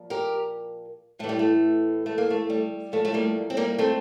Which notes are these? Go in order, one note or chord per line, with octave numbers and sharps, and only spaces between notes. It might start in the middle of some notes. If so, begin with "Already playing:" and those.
Already playing: A#2 F3
G4 A#4
A2 E3 A3
G3
A3
A3
A#3
A3
G3
A2 F3 A3
A3
G3 A#3
C4
G3 A#3
A3 C4